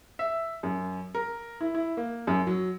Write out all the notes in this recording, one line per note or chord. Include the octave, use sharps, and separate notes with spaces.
E5
F#2
A#4
E4
E4
A#3
F#2
F#3